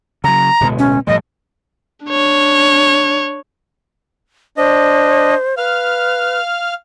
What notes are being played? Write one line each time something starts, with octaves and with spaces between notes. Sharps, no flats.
C#3 F#3 A#5
D1 B2 G#3
C#4
A2 F3 G3 D#5
D4 C#5
D4 C5 D#5
B4 F5 F6